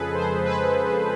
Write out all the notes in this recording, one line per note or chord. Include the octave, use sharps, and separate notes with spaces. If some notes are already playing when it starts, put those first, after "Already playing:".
Already playing: F2 C#3 F3 G#3 G#4 A4 B4
C5
B4